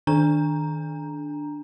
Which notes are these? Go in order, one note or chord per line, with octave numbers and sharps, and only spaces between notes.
D#3 D4 A#5